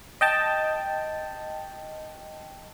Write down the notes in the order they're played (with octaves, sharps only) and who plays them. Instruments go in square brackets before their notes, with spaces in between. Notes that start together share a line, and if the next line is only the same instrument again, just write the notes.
[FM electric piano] D#5 G5 A5